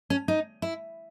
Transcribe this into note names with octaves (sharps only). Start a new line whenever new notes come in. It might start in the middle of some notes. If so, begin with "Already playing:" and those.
C#4
D#4
E4